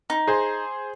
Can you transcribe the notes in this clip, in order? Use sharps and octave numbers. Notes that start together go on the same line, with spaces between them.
D#4
G#4 C5